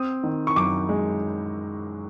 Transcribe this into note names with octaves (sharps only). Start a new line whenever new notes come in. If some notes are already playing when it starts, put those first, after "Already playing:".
Already playing: C4 D#6
D#3
C#6
F#2 D6
G#3